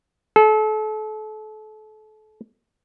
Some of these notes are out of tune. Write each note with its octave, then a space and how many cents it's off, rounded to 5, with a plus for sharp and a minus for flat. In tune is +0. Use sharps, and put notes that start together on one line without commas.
A4 -35